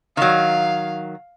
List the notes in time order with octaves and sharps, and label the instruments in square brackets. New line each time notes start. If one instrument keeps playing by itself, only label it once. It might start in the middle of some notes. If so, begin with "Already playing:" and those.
[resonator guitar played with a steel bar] D#3 F#3 [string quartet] F5